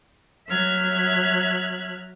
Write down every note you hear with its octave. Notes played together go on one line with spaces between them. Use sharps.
F#3 E5 F6 F#6 G#6